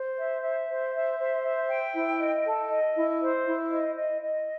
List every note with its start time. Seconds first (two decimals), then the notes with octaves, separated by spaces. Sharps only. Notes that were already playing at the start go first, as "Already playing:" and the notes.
Already playing: C5
0.19 E5
0.43 E5
0.68 C5
0.93 E5
1.18 C5
1.44 E5
1.69 G5
1.95 E4
2.19 D#5
2.45 A4
2.70 D#5
2.95 E4
3.21 C5
3.45 E4
3.70 D#5
3.96 D#5
4.21 D#5